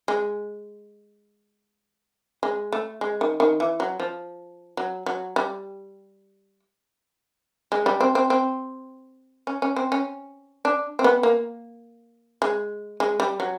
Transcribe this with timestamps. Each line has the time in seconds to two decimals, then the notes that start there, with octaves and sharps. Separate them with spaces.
0.08 G#3
2.43 G#3
2.72 A3
3.01 G#3
3.21 D#3
3.40 D#3
3.60 E3
3.80 F#3
4.00 F3
4.77 F#3
5.06 F#3
5.36 G3
7.72 G#3
7.86 G3
8.01 C4
8.15 C4
8.30 C4
9.47 C#4
9.62 C#4
9.76 C4
9.92 C#4
10.65 D4
10.99 C4
11.04 B3
11.23 A#3
12.42 G#3
13.00 G#3
13.20 G3
13.40 F#3